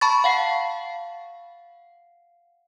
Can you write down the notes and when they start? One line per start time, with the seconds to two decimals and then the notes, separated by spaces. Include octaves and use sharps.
0.01 A5 B5 C#6 A6
0.24 F5 F#5 C7